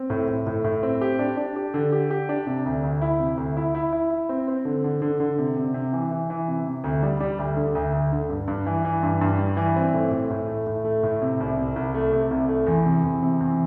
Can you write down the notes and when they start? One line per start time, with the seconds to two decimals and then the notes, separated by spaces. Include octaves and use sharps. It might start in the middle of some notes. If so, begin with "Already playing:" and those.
Already playing: C4
0.10 A2
0.28 A2
0.47 A2
0.64 A2
0.83 C4
1.01 G4
1.19 D4
1.37 D4
1.56 G4
1.74 D3
1.92 G4
2.11 G4
2.29 D4
2.47 C3
2.66 D2
2.83 D2
3.02 E4
3.19 C3
3.37 D2
3.57 E4
3.75 E4
3.93 E4
4.11 E4
4.29 C4
4.48 C4
4.65 D3
4.84 D3
5.02 D3
5.20 D3
5.39 C3
5.57 C3
5.74 C3
5.93 E3
6.11 E3
6.30 E3
6.48 C3
6.66 C3
6.84 D2
7.03 G3
7.20 G3
7.39 D2
7.57 D3
7.75 D2
7.93 D2
8.12 D3
8.30 G2
8.48 G2
8.66 E3
8.85 E3
9.03 G2
9.21 G2
9.39 G3
9.57 E3
9.76 C4
9.94 A2
10.11 A2
10.30 A2
10.48 A3
10.67 A2
10.85 A3
11.03 A2
11.22 C3
11.40 C2
11.57 C3
11.76 C2
11.94 A3
12.12 C3
12.31 C2
12.49 A3
12.67 E2
12.85 C3
13.04 E2
13.22 C3
13.40 E2